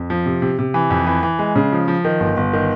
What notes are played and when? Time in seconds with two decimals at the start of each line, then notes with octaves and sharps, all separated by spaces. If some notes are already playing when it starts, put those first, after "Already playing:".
Already playing: F2
0.10 F3
0.26 C3
0.42 C3
0.59 C3
0.74 E3
0.90 F2
1.07 E3
1.23 E3
1.39 G#3
1.56 C#3
1.72 F3
1.88 F3
2.05 D#3
2.20 G1
2.37 G1
2.53 D#3